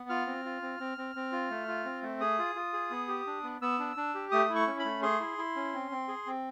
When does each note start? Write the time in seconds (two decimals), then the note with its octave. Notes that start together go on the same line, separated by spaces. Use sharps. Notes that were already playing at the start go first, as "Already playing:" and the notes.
Already playing: B3
0.09 F4 F6
0.26 C4
0.45 F4
0.62 C4
0.80 C4
0.98 C4
1.16 C4
1.32 F4
1.50 A3
1.68 F4
1.85 C4
2.02 A3
2.21 G#4 D#6
2.39 F4
2.55 F4
2.73 G#4
2.91 B3
3.08 G4
3.26 D4
3.43 B3
3.62 B3 E6
3.79 D4
3.96 D4
4.15 G4
4.32 A3 D#6
4.50 E4
4.55 C#6
4.67 C#4
4.79 B5
4.85 A3
5.02 G#4 C6
5.20 E4
5.38 E4
5.56 C#4
5.73 C4
5.91 C4
6.08 G#4
6.26 C4